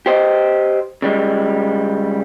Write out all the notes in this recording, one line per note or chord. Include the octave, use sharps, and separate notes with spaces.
G4 C5 D#5
C#3 G3 G#3